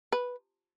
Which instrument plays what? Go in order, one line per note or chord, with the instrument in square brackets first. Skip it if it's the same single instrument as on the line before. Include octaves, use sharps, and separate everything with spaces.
[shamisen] B4